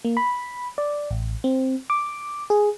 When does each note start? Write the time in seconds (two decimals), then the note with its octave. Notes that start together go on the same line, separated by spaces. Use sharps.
0.05 A#3
0.17 B5
0.78 D5
1.11 A1
1.44 C4
1.90 D6
2.50 G#4